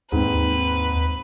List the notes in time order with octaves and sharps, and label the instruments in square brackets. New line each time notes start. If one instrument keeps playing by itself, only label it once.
[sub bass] D#2 [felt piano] G#2 C4 [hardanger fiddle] B4